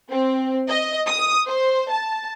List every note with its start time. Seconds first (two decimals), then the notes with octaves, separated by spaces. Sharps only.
0.11 C4
0.69 D#5
1.07 D#6
1.47 C5
1.90 A5